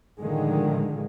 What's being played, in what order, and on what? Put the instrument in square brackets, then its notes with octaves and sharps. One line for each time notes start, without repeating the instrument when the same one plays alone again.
[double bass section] A2 D3 D#3 F3 G#3